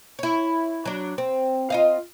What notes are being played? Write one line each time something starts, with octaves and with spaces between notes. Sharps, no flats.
E4 C#5
F#3 D4
C4
F4 D#5 F5